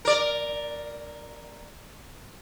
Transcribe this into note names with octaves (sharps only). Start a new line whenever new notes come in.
A#4 D5